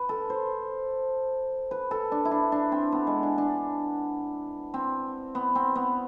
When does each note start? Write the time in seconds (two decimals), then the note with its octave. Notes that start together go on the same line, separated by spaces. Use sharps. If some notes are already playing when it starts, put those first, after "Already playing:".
Already playing: B4
0.09 A4
0.30 C5
1.71 B4
1.91 A4
2.12 D4
2.25 E4
2.31 D4
2.52 D4
2.72 C4
2.92 B3
3.07 G#3
3.23 D4
3.38 D4
4.74 C4
5.35 B3
5.55 C4
5.75 B3